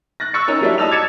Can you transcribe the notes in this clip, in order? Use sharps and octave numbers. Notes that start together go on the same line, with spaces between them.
F#6 A6 A#6
C#6 E6 F#6 A6 C#7
C#4 D#4 A#4
F#3 G3 A#3 D4 E4
D#5 A5 E6 F7
D6 G#6 A6 C#7 E7